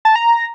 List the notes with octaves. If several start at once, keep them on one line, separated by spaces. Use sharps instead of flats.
A5
A#5